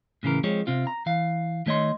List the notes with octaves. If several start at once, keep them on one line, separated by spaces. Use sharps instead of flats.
A2 C#3 E3 A#4
F3 G#3 C4 C#5
C3 C4 F4
A#5
E3 F5
D#3 A3 C#5 D#5 C6